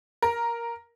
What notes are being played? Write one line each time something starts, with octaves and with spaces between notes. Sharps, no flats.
A#4